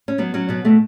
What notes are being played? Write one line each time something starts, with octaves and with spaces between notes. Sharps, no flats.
C#4
F#3 B3
F#3 C#4
B2 B3
B2 A3